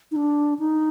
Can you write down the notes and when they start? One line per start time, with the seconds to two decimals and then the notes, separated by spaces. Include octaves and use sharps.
0.11 D#4
0.16 D4
0.59 D#4